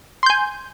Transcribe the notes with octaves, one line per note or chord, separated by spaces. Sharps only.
G#5 C6 G6